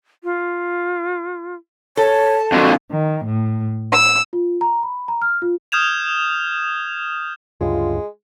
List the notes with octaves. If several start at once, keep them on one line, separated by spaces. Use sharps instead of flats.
F4
A4 C#5 A5
F2 D3 F#4
D#3
A2
E6
F4
A#5
B5
A#5
F6
F4
D#6 F6 G6 G#6 E7 F7
D2 G2 C#3 G#3 F4